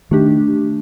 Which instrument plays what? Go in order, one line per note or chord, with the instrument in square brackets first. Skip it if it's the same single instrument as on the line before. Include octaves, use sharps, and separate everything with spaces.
[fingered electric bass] D#3 [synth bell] A3 D4 G4